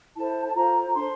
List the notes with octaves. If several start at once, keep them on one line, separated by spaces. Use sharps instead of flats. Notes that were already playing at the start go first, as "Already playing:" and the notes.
E4 A4 C5 A5
A5
F4 A4 C5 A#5
D4 A4 C5 C6